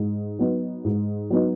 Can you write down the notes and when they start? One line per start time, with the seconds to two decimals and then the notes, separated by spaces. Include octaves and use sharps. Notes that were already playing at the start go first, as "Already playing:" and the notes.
Already playing: G#2
0.39 F#3 B3 D#4
0.85 G#2
1.30 F#3 B3 D#4